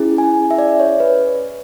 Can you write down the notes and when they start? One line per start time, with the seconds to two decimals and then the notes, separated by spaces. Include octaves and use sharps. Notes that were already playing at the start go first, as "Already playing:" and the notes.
Already playing: C#4 E4 G#4
0.18 G#5
0.51 E5
0.58 D5
0.80 C#5
1.00 B4